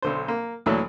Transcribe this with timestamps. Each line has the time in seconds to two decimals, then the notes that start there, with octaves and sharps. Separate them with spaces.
0.02 B1 D3 C5
0.28 A#3
0.66 D2 A#2 E3 F#3 A4